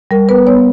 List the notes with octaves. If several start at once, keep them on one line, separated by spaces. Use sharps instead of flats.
G3 A#4
B3 B4
B3 C#5